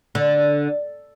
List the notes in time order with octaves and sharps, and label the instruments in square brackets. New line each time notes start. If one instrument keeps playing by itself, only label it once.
[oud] D3